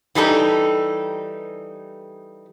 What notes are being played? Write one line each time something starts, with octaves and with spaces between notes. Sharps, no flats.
E3 G3 D#4 A4